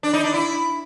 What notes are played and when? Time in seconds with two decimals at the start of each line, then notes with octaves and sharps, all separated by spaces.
0.03 D4
0.13 D#4
0.24 D4
0.34 E4